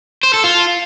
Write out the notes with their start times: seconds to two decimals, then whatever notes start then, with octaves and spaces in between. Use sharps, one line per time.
0.23 C5
0.34 A4
0.44 F4